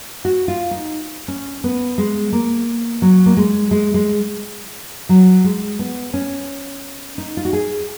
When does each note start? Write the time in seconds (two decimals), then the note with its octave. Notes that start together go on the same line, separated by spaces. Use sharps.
0.25 F#4
0.48 F4
0.71 D#4
1.28 C#4
1.64 B3
1.98 G#3
2.33 A#3
3.02 F#3
3.26 A#3
3.37 G#3
3.71 G#3
3.94 G#3
5.09 F#3
5.44 G#3
5.79 B3
6.14 C#4
7.18 D#4
7.37 F4
7.45 F#4
7.53 G#4